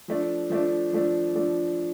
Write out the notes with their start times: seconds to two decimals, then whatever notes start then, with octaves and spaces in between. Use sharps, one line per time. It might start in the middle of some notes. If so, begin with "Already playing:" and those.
0.08 F3 A3 D4
0.50 F3 A3 D4
0.93 F3 A3 D4
1.35 F3 A3 D4